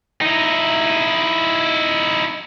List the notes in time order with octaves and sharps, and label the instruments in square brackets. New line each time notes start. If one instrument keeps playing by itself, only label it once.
[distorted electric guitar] D#4 E4